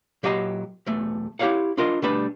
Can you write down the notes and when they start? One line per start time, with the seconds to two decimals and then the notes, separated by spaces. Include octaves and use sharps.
0.23 A#2 F#3 G4 D#5 G#5 C6
0.87 B1 E2 A3
1.39 E4 G4 A#4 C#5 F5 F#5
1.77 D4 F4 A#4 D#5
2.02 B2 G3 A3 D4 B4 B5